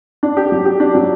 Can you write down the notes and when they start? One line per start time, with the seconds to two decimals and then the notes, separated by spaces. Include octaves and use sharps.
0.23 D4
0.37 G4
0.52 F#3
0.65 G4
0.80 D4
0.95 F#3